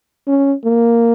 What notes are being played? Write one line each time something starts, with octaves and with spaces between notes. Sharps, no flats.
C#4
A#3